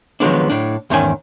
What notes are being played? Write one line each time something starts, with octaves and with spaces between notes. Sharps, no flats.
D#3 F3 F#3 G#3 B3 D4
A2 D4
E2 G#2 D#3 C#4 G5 G#5